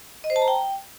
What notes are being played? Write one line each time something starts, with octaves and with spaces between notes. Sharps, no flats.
D#5
C5
A5
A#5
G5